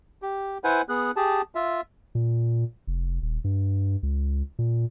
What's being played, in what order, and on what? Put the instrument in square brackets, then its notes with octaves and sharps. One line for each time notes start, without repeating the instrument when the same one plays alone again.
[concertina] G4
E4 B4 C5 F#5 G#5
B3 G#4 F#6
G4 G#4 A5
F4 E5
[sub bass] A#2
F1
D#1
G2
C#2
A#2